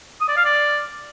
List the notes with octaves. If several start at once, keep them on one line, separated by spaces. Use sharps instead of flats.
D#6
D5
F5
D5